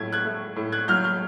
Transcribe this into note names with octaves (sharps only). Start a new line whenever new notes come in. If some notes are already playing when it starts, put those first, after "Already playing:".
Already playing: A2 F#3 G#6
F#6 G#6
A3
A2
F#6 G#6
F#3 F6 G6
F6 G6